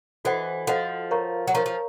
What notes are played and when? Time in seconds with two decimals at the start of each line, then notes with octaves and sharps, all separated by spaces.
0.25 E3 F#4 A4 C5 D#5 F#5
0.67 F3 F#4 A4 C5 D#5 F#5
1.11 A#4 C#5 F5 A#5 C#6
1.47 F#3
1.54 F3 A#4 C#5 F5 A#5 C#6
1.66 F3